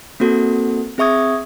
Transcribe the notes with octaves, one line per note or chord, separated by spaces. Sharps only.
A#3 C4 F#4 A4
C4 G#4 E5 C#6 D#6 G#6